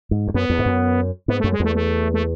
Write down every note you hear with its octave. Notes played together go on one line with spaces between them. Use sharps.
G#2
E2
F#2 B3
E2
G#2
F#2
G#2 B3
A3
F#2
G#3
E2 A3
A3
A3